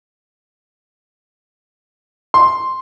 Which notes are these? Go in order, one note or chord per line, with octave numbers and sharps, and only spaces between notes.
C6